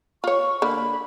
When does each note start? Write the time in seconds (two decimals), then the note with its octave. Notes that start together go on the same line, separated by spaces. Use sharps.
0.24 F4 C#5 C#6
0.62 D3 A#3 B5